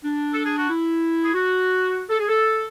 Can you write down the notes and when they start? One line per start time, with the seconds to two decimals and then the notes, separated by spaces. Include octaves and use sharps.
0.04 D4
0.33 A4
0.46 G#4
0.57 F#4
0.70 E4
1.23 G#4
1.34 F#4
2.09 A4
2.19 G#4
2.28 A4